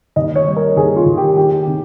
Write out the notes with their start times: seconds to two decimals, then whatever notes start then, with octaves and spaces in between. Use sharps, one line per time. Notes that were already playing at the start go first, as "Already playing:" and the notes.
0.16 D#2 D#5
0.36 C#5
0.47 G3
0.56 A#4
0.77 D#2 G#4
0.96 F4
1.06 D#2
1.17 G4
1.37 D#2 G4
1.67 D#3